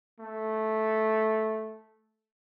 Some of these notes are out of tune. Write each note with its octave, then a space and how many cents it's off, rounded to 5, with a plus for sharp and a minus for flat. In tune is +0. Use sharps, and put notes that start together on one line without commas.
A3 -10